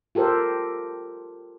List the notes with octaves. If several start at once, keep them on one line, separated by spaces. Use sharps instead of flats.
F4 G4 A4 A#4 C5